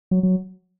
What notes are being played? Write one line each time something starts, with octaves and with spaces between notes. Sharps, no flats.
F#3
F#3